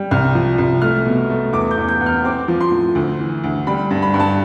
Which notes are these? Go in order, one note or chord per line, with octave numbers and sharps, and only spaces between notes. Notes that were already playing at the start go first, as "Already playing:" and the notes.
Already playing: G3
C2 F6
F3
C2
A3 F6
B2
A3
E2 D6
G6
E2
G6
E2
F6
C4 D6
F3
C6
A2
D2
E3
D2
G3 B5
G2
B5
G2
A5